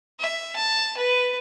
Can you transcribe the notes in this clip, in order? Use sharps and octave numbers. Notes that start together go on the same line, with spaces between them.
E5
A5
B4